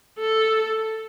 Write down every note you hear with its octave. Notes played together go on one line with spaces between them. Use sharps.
A4